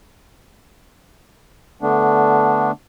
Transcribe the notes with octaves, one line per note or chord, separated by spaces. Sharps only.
D3 A3 B3 D4